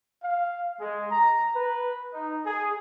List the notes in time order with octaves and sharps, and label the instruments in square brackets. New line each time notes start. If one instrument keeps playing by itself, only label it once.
[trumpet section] F5
G#3
A#5
B4
D#4
G#4